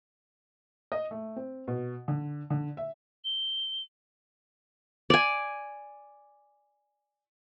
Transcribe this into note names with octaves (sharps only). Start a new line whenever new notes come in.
D#5
A3
C4
B2
D3
D3
E5
G7
D5 G#5